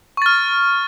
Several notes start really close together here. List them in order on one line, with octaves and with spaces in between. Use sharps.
C#6 A6 F6